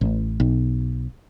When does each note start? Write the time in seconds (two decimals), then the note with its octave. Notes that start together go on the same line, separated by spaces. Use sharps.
0.01 A1
0.40 B1